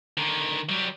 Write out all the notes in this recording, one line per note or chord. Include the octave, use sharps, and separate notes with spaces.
D3 D#3
F#3 G3